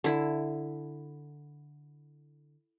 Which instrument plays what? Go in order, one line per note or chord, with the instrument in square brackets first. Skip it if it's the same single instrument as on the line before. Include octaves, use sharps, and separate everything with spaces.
[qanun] D3 E4